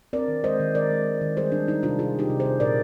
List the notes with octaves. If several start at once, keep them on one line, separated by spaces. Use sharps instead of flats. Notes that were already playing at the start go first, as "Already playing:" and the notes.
C4 A#4 D5
D#3
G#3 C5 D#5
D#3
G#3 A#4 D5
G#3
D#3
D#3
G3 G#4 C5
G3 D4
G3 D#4
C3 D4 F4
C3 F4 G#4
C3 D#4 G4
C3
G#4 C5
C3
A#2 A#4 D5